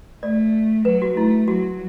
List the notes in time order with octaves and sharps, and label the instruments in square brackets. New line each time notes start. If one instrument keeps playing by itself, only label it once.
[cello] A3 [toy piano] D5
[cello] F#3 [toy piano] B4
[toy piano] F#4
[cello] A3 [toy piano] E4
[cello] F#3 [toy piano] F#4